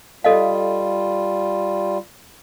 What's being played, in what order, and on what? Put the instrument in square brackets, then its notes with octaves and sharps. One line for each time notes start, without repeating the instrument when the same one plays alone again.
[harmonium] G3 F4 [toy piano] A4 D#5 F5